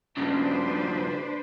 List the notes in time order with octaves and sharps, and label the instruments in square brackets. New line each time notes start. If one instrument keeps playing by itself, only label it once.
[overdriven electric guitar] G2 C#3 [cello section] D4 B4 C5